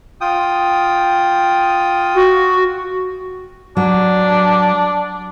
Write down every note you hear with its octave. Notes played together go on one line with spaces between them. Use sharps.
F4 G5 D#6
F#4
F#3 D4